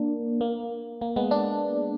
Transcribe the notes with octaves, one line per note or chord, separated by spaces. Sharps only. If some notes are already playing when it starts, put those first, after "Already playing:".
Already playing: A#3 D4
A#3
A#3
G#3 B3
D4